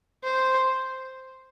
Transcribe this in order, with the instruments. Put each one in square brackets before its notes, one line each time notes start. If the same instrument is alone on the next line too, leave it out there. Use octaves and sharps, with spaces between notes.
[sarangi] C5